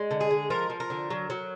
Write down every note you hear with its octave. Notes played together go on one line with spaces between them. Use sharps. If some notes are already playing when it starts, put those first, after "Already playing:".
Already playing: G#3
D3
G#4
G#3
F3 A#4
F3
A#4
D3
F#3
F#3